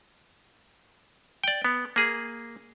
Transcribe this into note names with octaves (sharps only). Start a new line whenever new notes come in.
D5 G5
B3
A#3 G#4